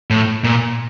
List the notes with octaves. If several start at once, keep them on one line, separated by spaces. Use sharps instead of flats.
A2
A#2